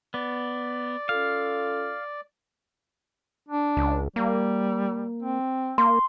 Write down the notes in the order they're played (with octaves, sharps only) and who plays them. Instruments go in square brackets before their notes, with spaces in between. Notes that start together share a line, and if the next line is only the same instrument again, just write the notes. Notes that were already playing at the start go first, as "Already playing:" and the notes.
[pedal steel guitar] B3 [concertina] D5
[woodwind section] C#4 F4 A4 [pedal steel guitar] F5
[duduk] D4
[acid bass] C#2
[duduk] G3 [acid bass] A#3
[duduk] C4
[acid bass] A#3 [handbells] C6